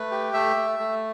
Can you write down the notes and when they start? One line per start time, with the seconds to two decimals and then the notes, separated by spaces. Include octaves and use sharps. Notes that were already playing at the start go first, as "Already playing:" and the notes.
Already playing: A3 B4
0.11 G4
0.34 A3 E5
0.56 A3
0.79 A3